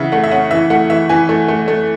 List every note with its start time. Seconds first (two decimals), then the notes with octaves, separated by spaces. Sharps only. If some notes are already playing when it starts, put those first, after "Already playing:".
Already playing: C#3 E3 E5 F#5
0.12 A3 F#5
0.24 E5
0.31 C#4 F#5
0.51 E3 E5
0.70 A3 F#5
0.90 E3 E5
1.09 E3 G#5
1.29 A3
1.48 A3
1.68 A3